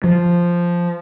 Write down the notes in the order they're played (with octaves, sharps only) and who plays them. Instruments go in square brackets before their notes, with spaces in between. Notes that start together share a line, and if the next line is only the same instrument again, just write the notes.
[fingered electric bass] F3